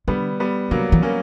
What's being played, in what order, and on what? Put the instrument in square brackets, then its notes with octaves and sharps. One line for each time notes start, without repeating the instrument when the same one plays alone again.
[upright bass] D3 [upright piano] G3 B3
[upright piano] G3 B3
[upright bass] D3 [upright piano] F#3 A#3
[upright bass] E3
[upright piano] A#3 C#4